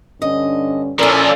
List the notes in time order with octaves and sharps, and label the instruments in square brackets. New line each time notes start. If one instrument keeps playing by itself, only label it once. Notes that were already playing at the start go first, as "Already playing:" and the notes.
[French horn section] G2 D3 C#4 [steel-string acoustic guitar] D#5
[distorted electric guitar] A#2 F3 [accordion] C#4 A4 D5 [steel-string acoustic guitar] E4 A#4